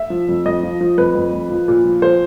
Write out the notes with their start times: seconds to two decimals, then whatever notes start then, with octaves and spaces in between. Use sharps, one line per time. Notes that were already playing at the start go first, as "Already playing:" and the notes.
Already playing: E5
0.10 F3
0.29 F2
0.46 F2 D#5
0.63 F3
0.81 F3
0.98 F2 B4
1.15 F2
1.33 F2
1.50 F3
1.68 A#2
1.85 F3
2.02 F3 C5